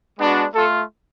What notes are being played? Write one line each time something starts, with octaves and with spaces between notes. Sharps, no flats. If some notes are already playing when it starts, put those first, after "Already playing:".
G#3 B3 D4 F#4
A3 F4 A4